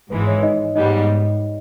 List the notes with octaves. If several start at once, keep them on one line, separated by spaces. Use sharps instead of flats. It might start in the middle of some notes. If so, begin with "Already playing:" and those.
G#1 G#2 E3 G#3 B4
C#5
D#4 D#5
G#2 G3 B3 D#4 D#5